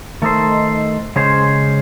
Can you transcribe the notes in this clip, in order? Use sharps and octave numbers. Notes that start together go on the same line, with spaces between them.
D#3 A3 D#4 A4 C5
C#3 G#3 C#4 G#4 C5